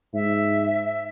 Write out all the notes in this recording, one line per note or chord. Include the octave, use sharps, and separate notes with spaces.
G#2 E5